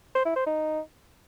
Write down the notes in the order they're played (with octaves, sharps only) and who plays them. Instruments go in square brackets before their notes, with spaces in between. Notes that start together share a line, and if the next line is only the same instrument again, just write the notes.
[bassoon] C5
E4
C5
D#4